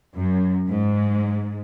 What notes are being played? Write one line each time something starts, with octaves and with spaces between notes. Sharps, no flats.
F#2
G#2